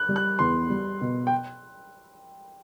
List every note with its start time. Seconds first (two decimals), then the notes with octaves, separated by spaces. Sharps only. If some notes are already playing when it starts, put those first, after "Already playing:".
Already playing: F#6
0.09 G3
0.16 F#6
0.39 E2 C6
0.70 G3
1.01 B2
1.27 G5